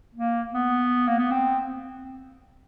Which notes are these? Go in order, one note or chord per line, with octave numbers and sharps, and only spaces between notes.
A#3
B3
A#3
B3
C4